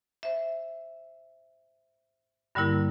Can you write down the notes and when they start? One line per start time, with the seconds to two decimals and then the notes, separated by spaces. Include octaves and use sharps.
0.23 C5 E5
2.55 G2 D3 G3 A#3 E4 A#4